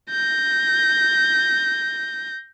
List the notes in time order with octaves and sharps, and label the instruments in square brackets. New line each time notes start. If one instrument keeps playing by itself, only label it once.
[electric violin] G6 A#6